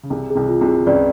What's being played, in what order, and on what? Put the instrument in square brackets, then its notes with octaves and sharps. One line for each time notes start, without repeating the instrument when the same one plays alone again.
[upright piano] C#3
[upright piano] C2 C3 [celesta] G#4
[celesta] G#4
[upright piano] C2 C3
[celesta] F4
[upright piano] C2 C3
[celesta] G#4
[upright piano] C#2 C#3 [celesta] D5